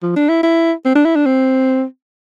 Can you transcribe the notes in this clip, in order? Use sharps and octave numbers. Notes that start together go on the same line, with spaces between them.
F3
D4
E4
E4
C4
D4
E4
D4
C4